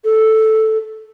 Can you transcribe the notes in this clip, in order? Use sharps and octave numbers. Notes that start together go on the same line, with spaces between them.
A4